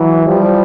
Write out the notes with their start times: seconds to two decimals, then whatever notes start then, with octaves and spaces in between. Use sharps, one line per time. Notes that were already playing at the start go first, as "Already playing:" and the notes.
Already playing: E3 F#3
0.26 F3 G3